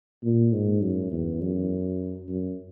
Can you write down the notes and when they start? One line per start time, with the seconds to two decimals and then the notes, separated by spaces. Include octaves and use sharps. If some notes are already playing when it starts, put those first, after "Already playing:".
0.23 A#2
0.53 G#2
0.81 F#2
1.11 E2
1.41 F#2
2.28 F#2